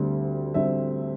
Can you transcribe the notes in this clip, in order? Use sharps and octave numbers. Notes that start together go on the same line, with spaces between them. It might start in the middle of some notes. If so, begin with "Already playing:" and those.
Already playing: D2 D3 G3 C4
D3 G3 C4 E5